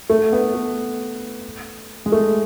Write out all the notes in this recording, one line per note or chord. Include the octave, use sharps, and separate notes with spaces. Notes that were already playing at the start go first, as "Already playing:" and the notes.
A3
B3
A3
G#3
A3